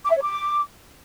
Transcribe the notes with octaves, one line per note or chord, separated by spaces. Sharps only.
D6
E5
C#5
D6